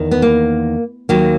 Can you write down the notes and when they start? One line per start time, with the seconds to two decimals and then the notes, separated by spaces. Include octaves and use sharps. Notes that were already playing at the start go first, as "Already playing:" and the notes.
Already playing: E2 D#3
0.11 B3
0.22 A#3
1.09 D#2 D#3 F#3 A#3